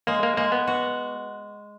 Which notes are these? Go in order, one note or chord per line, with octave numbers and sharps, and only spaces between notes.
G#3 A#3
A#3
G#3 A#3
B3
F#4